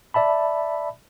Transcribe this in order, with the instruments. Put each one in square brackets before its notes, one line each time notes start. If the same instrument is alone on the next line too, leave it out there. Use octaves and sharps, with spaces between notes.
[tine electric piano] D5 E5 A5 B5